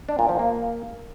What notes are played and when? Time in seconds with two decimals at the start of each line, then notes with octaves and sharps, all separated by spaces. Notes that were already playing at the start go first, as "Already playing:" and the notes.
0.09 D4
0.19 A#2
0.29 F3
0.39 A#3